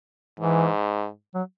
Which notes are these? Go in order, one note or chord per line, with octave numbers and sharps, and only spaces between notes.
G#2 E3
F#3